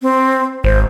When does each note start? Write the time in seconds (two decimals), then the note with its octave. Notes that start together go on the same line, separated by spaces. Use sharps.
0.02 C4
0.64 G#1 C5